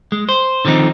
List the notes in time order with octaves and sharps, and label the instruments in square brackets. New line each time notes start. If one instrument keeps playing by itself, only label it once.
[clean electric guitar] G#3
C5
D3 D#3 F3 C4 D#4